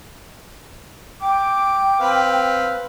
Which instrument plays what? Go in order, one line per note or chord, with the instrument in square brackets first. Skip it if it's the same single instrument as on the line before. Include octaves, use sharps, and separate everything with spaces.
[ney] G5 [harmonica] D6
[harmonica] C4 B4 F5